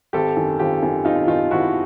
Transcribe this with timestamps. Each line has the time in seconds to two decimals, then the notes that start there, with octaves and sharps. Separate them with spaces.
0.13 G#1 G4 A4
0.36 F#2 D#3
0.59 G#1 F4 G4
0.83 F#2 D#3
1.05 G#1 D#4 F4
1.28 F#2 D#3 D#4 F4
1.51 G#1 E4 F#4